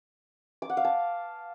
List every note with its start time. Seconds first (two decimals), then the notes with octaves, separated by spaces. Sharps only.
0.62 D6
0.70 F#5
0.77 F5
0.85 A5